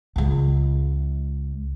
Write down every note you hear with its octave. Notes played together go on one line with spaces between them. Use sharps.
C#2 G#3